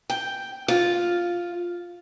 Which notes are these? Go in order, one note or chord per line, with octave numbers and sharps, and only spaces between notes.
G5
F4